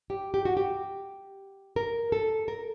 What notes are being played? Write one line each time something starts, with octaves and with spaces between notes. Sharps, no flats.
G4
G4
F#4
G4
A#4
A4
A#4